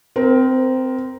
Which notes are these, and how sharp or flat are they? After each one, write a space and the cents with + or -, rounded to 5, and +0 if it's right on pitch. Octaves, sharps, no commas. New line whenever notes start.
C4 -15 A#4 +10